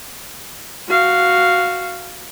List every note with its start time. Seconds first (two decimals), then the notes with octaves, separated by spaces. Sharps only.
0.89 F#4 F5